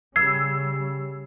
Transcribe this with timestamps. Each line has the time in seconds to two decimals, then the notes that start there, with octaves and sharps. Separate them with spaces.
0.16 C#3 G3 C#4 E6 G#6 C7